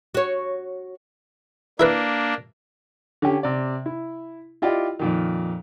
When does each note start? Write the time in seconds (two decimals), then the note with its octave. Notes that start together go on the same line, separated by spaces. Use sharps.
0.14 F#4 C#5
1.80 A#3 D4 E4 A#4 B4
3.22 D3 C#4 G4
3.43 C3 D5
3.86 E4
4.62 E4 F4 G4 D5 D#5
4.99 F2 A#2 D#3